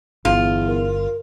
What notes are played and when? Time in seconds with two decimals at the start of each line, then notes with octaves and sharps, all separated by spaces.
0.25 G1 E2 F4
0.68 A#4